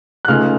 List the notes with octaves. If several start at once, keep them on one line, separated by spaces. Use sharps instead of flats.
F#6
C#2 C#3 A3 D#4 F6